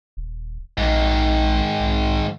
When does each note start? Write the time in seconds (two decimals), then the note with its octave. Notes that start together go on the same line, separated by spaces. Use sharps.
0.17 D#1
0.77 A#1 G#2 D#3
1.80 B1